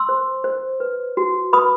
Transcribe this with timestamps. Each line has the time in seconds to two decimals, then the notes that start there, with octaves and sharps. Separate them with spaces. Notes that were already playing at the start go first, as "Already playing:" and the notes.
Already playing: C6 E6
0.09 C5
0.44 C5
0.80 B4
1.17 F#4
1.53 B4 B5 D#6